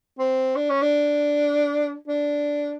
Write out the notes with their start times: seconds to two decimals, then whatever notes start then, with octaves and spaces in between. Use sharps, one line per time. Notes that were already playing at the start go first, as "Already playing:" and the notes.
0.19 C4
0.56 D4
0.70 C#4
0.82 D4
2.08 D4